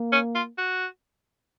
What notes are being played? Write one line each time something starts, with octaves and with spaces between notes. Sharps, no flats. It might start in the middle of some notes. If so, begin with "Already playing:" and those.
Already playing: A#3
C#4
F4
F#4